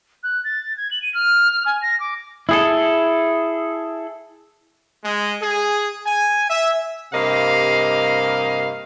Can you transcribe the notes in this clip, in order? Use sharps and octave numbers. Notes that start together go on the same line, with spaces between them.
F#6
A6
G#6
F#7
D#7
F6
G#5
A#6
D6
E4 G#4 A4
G#3
G#4
G#5
E5
G2 C3 A#3 D#5 F5